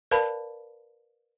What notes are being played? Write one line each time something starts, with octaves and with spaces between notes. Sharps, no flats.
A#4 B4 D5 F5 A5 B5